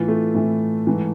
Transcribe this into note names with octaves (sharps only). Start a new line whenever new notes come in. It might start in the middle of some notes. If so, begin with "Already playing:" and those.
Already playing: A2 E3 F4
A3
A2 E3
G#2 E3